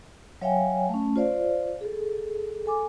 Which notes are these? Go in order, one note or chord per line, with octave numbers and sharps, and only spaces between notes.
F#3 C#5 E5 F5 G5 G#5
A3 C#4
F4 C5 D5 F5
G#4 A4
A4 G#5 D6